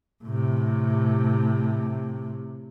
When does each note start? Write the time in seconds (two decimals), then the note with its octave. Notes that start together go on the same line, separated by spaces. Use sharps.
0.24 A2 C3